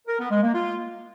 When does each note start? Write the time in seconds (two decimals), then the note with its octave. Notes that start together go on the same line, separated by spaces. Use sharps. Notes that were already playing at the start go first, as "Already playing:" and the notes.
0.08 A#4
0.19 B3
0.31 G#3
0.42 A#3
0.54 F4